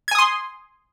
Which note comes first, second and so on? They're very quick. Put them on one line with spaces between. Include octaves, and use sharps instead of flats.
G#6 G#5 D#6 C6